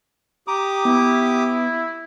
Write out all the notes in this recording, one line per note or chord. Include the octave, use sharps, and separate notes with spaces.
G4 A#5 D6 D#6
B3 E4